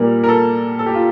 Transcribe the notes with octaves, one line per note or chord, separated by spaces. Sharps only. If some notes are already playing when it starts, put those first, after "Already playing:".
Already playing: A#2 G3 A#3 A#4
A#4
A4
A4
G4
F4